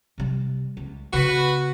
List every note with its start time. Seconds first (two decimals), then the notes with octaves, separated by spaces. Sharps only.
0.18 C3 G3
0.77 C#2
1.13 C#3 B3 F#4 B4